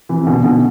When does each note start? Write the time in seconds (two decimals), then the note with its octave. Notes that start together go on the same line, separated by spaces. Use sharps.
0.09 C3 E3
0.27 B2 D3
0.44 B2 D3